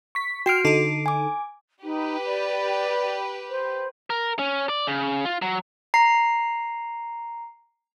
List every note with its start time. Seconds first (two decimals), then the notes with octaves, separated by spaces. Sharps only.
0.15 C#6 B6
0.46 F#4 G5 F6 C7 D7
0.65 D3 D#4 A4 C7 D7
1.06 G#5 D6
1.83 D#4 G4 B4
2.25 D5
3.49 C5
4.10 A#4
4.39 C#4
4.69 D5
4.87 C#3
5.25 F4
5.42 F#3
5.94 A#5 C7